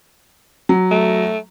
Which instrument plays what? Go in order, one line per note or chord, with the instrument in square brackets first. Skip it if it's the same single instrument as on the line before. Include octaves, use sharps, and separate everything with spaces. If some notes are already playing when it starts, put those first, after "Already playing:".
[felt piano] F#3
[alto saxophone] A3